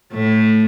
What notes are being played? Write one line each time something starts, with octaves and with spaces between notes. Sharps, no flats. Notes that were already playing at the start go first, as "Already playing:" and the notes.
A2 A3